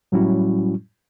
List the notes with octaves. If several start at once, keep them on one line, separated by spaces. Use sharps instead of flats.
A2 F#3 G3 C#4 E4 F#4